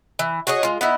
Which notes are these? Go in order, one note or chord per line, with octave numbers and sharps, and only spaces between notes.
E3
F#4 G#4 C#5 D#5
G#3 F4
B3 D#4 E4